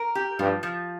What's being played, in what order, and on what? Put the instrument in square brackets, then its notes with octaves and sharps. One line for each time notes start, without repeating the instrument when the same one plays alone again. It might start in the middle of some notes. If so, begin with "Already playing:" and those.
Already playing: [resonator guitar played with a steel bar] A#4
G4
[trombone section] G2 [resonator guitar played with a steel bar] F3
[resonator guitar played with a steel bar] F3